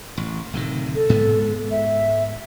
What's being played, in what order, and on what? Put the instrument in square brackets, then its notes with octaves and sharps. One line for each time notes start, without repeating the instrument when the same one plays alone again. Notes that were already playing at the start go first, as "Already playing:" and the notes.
[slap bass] A1
D1 C3 D#3
[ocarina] A4
[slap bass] G#2 G#3 B3
[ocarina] E5